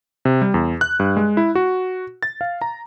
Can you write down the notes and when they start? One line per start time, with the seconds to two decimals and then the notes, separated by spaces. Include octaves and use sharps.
0.25 C3
0.42 G3
0.54 E2
0.81 F#6
1.00 G2
1.17 G#3
1.37 E4
1.55 F#4
2.23 A6
2.41 F5
2.62 A#5